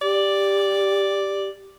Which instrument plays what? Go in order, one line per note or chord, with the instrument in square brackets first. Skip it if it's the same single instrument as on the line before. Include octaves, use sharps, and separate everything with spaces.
[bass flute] G4 [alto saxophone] D5